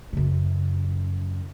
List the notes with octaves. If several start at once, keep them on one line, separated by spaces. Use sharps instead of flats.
F#2 C#3